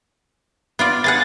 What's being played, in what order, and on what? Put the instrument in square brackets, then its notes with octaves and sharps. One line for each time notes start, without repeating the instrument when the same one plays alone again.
[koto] B3 F4 D5
[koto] B3 G#4 F#5 [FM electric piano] A6